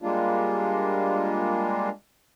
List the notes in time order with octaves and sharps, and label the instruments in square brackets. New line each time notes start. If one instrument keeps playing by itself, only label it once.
[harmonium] G3 G#3 A#3 D4 F4